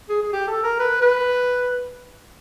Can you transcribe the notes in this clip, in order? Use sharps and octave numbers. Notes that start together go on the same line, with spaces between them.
G#4
G#4
G4
A4
A#4
B4
B4